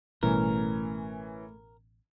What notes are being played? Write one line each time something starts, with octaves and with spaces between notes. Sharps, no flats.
A1 B2 E3 G3 A3 C#4 A#4